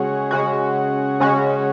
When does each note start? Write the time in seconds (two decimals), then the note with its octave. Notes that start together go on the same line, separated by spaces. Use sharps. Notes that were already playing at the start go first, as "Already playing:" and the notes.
Already playing: C#3 G#3 C#4 F#4
0.31 C#3 G#3 C#4 F#4
1.20 C#3 G#3 C#4 F#4